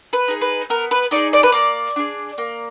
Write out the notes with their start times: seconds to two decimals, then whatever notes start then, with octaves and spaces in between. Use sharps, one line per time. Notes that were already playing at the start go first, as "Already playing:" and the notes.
0.13 B4
0.28 D#4 G#4
0.41 B4
0.70 B3 A#4
0.91 B4
1.11 D#4 G#4 D5
1.33 D5
1.43 B4
1.52 A#3 D5
1.96 D4 G#4
2.38 A#3